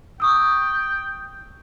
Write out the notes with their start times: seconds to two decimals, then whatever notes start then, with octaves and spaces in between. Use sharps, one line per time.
0.20 G5 C#6 D#6 E6